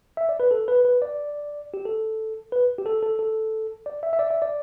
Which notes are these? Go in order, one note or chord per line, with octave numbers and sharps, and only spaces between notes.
E5
D5
B4
A4
B4
B4
D5
G4
A4
B4
G4
A4
A4
A4
D5
E5
E5
D5
E5
D5